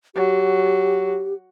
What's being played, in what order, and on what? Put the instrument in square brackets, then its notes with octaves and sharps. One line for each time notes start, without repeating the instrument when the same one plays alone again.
[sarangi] F#3 [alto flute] G4